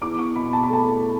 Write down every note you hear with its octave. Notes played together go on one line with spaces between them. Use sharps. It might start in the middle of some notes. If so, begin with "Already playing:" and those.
E2 D6
C#6
B2 B5
A5
B5
A3 A5